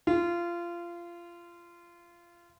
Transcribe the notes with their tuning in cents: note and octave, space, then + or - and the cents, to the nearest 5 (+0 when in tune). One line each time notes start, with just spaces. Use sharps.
F4 -20